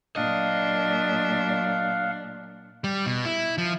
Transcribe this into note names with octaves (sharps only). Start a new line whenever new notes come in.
A#2 F#3 D4 D#5 F5 F#5
G3
B2
E4
F3